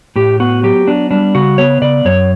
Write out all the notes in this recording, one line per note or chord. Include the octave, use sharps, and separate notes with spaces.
A2 G4
B3 F#4
F#3 G4
B3 D4
G3 D4
C#3 F#4
B3 C#5
C#3 D5
F#2 C#5